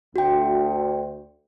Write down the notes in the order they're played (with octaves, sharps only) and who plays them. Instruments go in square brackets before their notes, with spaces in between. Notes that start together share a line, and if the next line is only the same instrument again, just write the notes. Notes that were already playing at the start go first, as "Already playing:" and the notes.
[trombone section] D2 [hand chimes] F#4 G5